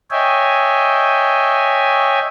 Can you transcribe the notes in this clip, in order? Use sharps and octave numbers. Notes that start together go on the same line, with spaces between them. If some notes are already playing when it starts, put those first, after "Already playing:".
C#5 D#5 E5 G5 G#5